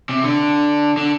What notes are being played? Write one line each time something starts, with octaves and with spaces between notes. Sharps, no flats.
C3
D3
D3